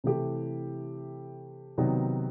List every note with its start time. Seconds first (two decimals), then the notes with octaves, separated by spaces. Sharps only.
0.04 C3 E3 A3 E4 G4
1.78 C3 D#3 F#3 B3 D#4